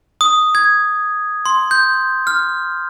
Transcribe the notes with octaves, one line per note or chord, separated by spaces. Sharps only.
D#6
G#6
C6
G6
F6